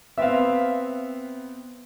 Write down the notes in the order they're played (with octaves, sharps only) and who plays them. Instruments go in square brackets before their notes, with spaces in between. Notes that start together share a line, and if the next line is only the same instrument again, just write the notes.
[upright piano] B3 C4 [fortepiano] E5 F5